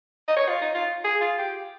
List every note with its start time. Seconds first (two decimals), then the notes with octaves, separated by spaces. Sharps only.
0.28 D#5
0.37 C#5
0.49 F4
0.62 D#4
0.75 F4
1.04 G#4
1.21 F4
1.38 G4